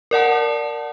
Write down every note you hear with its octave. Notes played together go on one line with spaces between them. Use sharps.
A#4 D5 F#5 A5